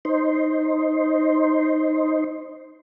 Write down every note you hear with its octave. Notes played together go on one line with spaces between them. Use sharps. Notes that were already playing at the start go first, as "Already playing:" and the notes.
D#4 C5